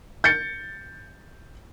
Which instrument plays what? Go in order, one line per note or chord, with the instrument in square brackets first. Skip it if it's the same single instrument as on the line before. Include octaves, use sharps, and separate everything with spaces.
[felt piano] G6 A6 C#7